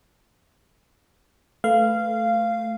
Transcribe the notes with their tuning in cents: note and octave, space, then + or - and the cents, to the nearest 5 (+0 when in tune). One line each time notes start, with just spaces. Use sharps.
A3 -5 B4 +5 F5 -15